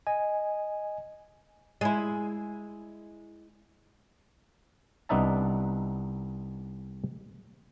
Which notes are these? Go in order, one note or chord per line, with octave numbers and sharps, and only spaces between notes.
D#5 G#5
G#3 E4
C2 B3 D4 D#4 E5 A5